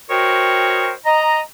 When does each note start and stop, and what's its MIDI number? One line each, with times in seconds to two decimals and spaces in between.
0.10 0.93 66
0.10 0.93 70
0.10 0.93 72
0.10 0.93 73
0.10 0.93 75
0.10 0.93 79
1.05 1.39 75
1.05 1.39 82